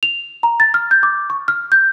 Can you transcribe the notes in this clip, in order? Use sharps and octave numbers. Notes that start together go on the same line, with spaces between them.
F7
A#5
A6
F6
G6
D6
C#6
F6
G6